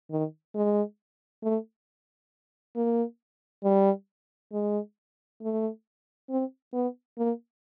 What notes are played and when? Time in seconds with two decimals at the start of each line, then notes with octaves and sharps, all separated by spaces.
0.11 D#3
0.55 G#3
1.43 A3
2.76 A#3
3.64 G3
4.52 G#3
5.42 A3
6.30 C4
6.74 B3
7.18 A#3